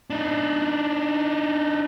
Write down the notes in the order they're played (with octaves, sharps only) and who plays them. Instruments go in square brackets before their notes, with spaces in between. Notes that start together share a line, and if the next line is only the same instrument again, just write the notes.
[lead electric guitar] D4 D#4